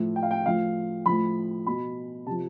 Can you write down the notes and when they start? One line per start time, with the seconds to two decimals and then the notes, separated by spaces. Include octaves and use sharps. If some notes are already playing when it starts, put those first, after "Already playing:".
Already playing: A2 F3
0.16 G5
0.23 F5
0.31 G5
0.46 A2 F3 F5
1.06 A2 F3 B5
1.67 B2 B5
2.26 C3 A5
2.31 F3